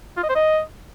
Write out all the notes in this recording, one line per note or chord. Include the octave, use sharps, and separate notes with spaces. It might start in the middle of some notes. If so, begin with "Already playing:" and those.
F4
D#5
C5
D#5